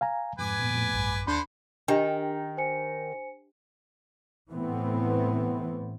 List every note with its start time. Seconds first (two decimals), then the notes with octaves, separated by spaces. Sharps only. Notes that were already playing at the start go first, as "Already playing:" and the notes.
0.01 F5 G#5 A#5
0.39 F2 G#2 B4 G#5 D6
0.59 A#2 B3
0.74 F2 A2
0.93 A#1 G2
1.27 D#2 D3 D4 C5 B5 G6
1.88 D#3 D4 G4 D#5 G5
2.57 C5 G#5 C#7
4.50 A2 E3 B3 C4